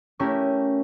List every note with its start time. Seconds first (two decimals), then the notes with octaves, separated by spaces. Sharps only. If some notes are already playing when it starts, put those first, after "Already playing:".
0.19 A3 C#4 E4 G4 A#4